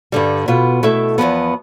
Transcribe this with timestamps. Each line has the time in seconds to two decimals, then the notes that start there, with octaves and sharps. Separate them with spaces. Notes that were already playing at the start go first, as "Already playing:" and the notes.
0.12 G2 D3 G3
0.48 B2 B3 F4
0.83 B2 A3 E4 A4 E5
1.18 E2 C3 F3 B3